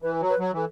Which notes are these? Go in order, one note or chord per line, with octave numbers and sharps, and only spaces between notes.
E3 B4
F#3
B4
F#3
E3 A4